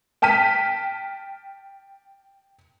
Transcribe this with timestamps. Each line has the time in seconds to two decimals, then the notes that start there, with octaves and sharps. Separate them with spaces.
0.22 G5 A5 F6 B6 D#7